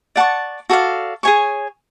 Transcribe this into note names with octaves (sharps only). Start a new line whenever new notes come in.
D5 F#5 A5 C#6
F#4 A4 D5 F5
G#4 C#5 G#5 C#6